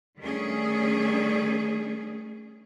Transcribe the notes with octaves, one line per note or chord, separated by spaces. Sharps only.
D#3 G3 A3 C#4 D4 G#4